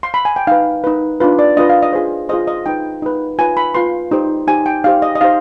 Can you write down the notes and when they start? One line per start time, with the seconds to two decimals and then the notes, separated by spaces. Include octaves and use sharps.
0.03 C6
0.14 B5
0.25 G#5
0.36 G5
0.47 D#4 B4 F5
0.84 D#4 B4
1.20 D4 F4 B4
1.39 D5
1.57 D4 F4 B4 D#5
1.69 F5
1.83 D#5
1.93 F4 G#4 C5
2.29 F4 G#4 C5 D#5
2.47 D#5
2.66 D#4 B4 G5
3.02 D#4 B4
3.39 F4 B4 G#5
3.57 B5
3.75 F4 B4 C6
4.11 D#4 G4 C5
4.47 D#4 G4 C5 G#5
4.66 G5
4.84 D#4 G4 C5 F5
5.02 D#5
5.15 D#5
5.21 D#4 G4 C5 F5